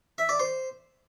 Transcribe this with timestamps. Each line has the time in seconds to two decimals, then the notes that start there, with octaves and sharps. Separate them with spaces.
0.18 E5
0.29 D5
0.40 C5